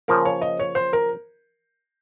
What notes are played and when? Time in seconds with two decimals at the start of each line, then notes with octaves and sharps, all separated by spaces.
0.08 C#3 F3 A#3 A#4
0.25 C#5
0.42 D#5
0.59 C#5
0.75 C5
0.93 A#4